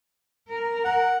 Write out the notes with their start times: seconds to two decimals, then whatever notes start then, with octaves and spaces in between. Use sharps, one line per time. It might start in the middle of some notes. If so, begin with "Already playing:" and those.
0.48 A#4
0.84 F#5